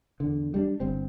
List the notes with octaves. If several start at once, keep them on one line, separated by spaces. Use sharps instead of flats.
E2 D3
G3 D4
G1 C4